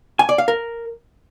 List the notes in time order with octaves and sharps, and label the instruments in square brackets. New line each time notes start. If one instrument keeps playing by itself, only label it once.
[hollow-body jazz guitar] G#5
D5
F5
A#4